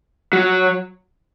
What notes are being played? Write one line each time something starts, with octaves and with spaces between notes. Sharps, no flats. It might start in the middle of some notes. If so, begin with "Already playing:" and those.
F#3